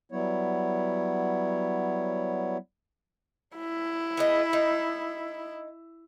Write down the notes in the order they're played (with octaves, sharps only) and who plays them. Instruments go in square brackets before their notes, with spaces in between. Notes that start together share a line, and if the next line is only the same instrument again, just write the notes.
[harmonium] F#3 G3 B3 E4 C#5
[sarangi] E4
[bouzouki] B3 G#4 D#5
D#4